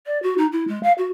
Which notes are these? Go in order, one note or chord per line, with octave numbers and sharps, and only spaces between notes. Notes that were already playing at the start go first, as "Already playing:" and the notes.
D5
F#4
D#4
E4
G#3
F5
F#4